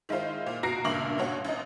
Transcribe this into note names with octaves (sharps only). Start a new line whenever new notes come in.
D#3 G#3 E4 F4 C5
A#2
B2 F#4 A#5 A#6 C7 D7
C#2 G2 A#2 E5 C#6 F#7
G2 B2 C#5 F#5
A1 D#4